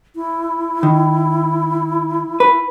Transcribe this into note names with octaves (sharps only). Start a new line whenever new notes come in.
E4
D#3
B4